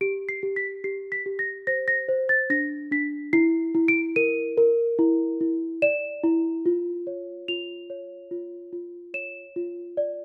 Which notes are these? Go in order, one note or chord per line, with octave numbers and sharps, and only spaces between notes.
G4 D7
C7
G4
B6
G4 C7
B6
G4
A#6
C5 A#6
A#6
C5
A6
D4 A#6
D4 B6
E4 C7
E4
D7
A#4 D#7
A#4
E4
E4
D5 E7
E4
F4
C#5
F4 F7
C#5
F4
F4
C#5 E7
F4
D5